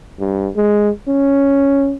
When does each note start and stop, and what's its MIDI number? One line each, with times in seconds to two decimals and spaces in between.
0.20 0.49 43
0.57 0.90 56
1.08 1.97 61